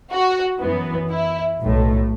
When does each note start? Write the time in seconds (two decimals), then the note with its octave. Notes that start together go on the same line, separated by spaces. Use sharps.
0.11 F#4
0.61 F#2 E3 B3
1.10 E4
1.60 B1 A2 A3